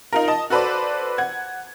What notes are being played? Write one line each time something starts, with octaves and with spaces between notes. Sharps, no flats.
D#4 F4 A#4
D#5 A5
F#4 A4 B4 C5 D5
F#5 G#6